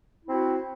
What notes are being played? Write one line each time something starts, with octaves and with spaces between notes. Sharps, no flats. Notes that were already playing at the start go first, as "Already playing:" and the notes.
C4 E4 F#4